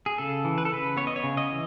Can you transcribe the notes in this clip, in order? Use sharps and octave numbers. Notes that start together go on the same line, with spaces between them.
G#4
C#3 A4
E3
B4
A4
C#3 B4
B3 C#5
D#5
C#5
C#3
D#5
E3